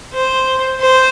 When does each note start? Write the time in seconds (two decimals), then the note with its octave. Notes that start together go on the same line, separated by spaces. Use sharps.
0.13 C5
0.81 C5